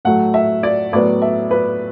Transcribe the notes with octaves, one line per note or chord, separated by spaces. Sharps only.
A2 F#3 A3 F#5
E5
D5
A2 F#3 B3 D5
E5
B4